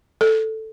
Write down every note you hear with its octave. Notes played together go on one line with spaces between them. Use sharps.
A4